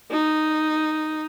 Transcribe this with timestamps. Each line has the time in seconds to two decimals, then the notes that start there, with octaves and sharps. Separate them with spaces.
0.11 D#4